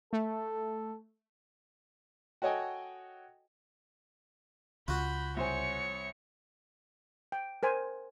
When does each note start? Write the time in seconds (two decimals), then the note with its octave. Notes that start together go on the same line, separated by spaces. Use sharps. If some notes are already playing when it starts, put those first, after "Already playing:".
0.13 A3 A4
2.42 F#4 A4 C#5 D#5 G5 G#5
4.88 C#2 F4 F#4 B5 G6
5.37 C2 C5 C#5 G#5 C#7
7.32 G5
7.63 A#4 C5 G#5